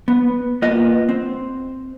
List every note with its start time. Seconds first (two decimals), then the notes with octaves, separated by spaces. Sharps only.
0.08 B3
0.62 A#3 B3 F4 D#5
1.09 C4